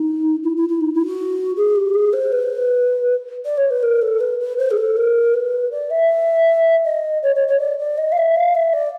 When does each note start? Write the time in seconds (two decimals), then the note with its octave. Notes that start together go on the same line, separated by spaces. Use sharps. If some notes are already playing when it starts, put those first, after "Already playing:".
Already playing: D#4
0.43 E4
0.56 E4
0.69 E4
0.80 D#4
0.94 E4
1.06 F#4
1.56 G#4
1.75 G4
1.94 G#4
2.13 C5
2.32 B4
3.45 D5
3.57 C#5
3.70 B4
3.82 A#4
4.01 A4
4.20 B4
4.39 B4
4.57 C5
4.70 G#4
4.77 A4
4.96 A#4
5.33 B4
5.71 D5
5.90 E5
6.84 D#5
7.22 C#5
7.35 C#5
7.48 C#5
7.59 D5
7.78 D5
7.97 D#5
8.12 F5
8.17 E5
8.35 F5
8.54 E5
8.73 D5